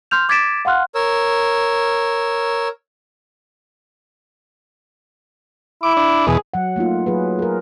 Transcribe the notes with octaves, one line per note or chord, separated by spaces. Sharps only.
C6 F6 G6 F7
D6 G#6 A6 B6 D7 E7
F5 F#5 C6 F6 F#6
A#4 C#5 E6
E4 D6
D4
E2 B2 G#4
F#3 F#5
A3 A#3 D#4 F4
F#3 G#4 B4
G#4 A#4